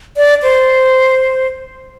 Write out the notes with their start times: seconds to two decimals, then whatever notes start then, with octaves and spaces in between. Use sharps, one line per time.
0.17 D5
0.43 C5